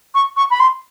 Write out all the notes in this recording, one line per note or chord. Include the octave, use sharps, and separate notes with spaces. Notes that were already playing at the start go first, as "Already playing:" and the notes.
C#6
C#6
B5
C6